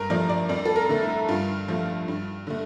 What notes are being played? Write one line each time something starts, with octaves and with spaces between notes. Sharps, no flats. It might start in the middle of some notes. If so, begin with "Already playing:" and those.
Already playing: G2 A#4
F3 A3 D5
D5
F2 D5
A4
A#4
D3 A3
E4
G2 F4
F3 A3
G2
D3 A3